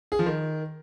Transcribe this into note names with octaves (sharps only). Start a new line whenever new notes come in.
G#4
F3
D#3